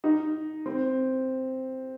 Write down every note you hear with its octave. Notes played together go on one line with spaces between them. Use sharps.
D#4
C4